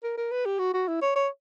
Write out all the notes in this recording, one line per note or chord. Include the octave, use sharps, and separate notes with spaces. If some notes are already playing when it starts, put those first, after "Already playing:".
A#4
A#4
B4
G4
F#4
F#4
E4
C#5
C#5